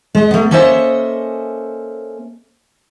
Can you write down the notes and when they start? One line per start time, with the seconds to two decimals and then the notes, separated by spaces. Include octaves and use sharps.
0.15 G#3 D#5
0.31 A3 B3
0.51 A#3 C#4 A4 C5 D#5 E5